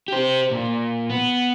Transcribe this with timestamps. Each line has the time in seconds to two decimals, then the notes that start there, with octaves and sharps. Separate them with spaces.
0.08 G4 C5
0.51 A#2
1.10 B3